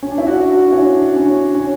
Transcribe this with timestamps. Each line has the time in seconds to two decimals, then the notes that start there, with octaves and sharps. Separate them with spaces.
0.03 C#4
0.11 D4
0.18 E4
0.27 D4 F#4
0.49 D4 F#4
0.72 C#4 E4
0.94 D4
1.16 C#4
1.55 C#4